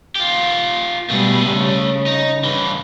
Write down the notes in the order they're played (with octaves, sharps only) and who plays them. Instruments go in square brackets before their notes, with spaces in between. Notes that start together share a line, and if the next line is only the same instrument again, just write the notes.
[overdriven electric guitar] F4 G4
[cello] B2 G3 [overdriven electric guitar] A3 G#4
[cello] C#3
[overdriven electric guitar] D#4
G2 E3